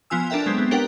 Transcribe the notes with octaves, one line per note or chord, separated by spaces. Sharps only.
F3 B3 F4 G#5 E6
D4 A4 A#4 E5 G5
F#3 G#3 B3 C4
B3
D4 G4 A#4 B4 F#5 G5